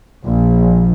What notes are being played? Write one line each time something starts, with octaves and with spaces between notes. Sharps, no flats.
A#1